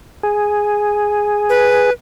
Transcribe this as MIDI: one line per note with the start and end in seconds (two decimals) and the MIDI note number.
0.23 1.90 68
1.49 1.92 71